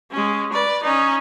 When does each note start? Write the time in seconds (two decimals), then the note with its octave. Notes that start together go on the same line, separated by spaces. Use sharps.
0.11 G#3 C#4
0.52 B4 D5
0.83 C#4 D#4